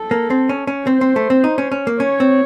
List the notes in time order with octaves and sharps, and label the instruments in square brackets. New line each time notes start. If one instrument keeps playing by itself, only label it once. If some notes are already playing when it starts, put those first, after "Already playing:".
Already playing: [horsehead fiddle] A4
[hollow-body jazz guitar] A#3
C4
C#4
C#4
[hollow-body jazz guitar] C4 [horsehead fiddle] C5
[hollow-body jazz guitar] C4
A3
C4
D#4
C#4
C#4
A#3
[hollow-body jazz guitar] C#4 [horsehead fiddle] C#5
[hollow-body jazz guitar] C4